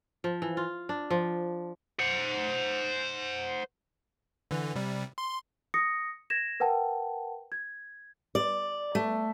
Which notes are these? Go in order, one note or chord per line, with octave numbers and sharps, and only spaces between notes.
F3
E3
F4
D4
F3
C5 F#5
D3 E3
C3 G3
C6
D#6 A#6 C#7
G#6 A#6 E7
A#4 B4 F#5 G5 A5
G#6
D5
A3